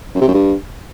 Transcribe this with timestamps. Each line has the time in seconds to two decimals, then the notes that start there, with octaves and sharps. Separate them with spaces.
0.15 F#2
0.21 C3
0.27 F#2
0.34 G2